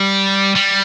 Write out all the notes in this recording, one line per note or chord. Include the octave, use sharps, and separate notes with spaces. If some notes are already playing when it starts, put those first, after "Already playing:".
Already playing: G3
G3